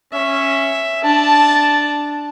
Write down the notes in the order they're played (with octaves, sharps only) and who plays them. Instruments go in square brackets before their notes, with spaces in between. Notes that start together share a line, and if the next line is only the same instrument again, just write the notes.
[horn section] C#4 [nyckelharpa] E5
[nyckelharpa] D4 [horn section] A5